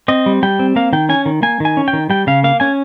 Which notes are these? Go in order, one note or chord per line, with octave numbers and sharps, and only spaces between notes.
C4 D#5
G3
G3 G5
C4
A#3 F5
D#3 G5
C#4 G#5
D#3
A#3 G#5
D#3 G#5
C#4
G5
D#3
G3 G5
C#3 F5
A#3 F5
C#4 G#5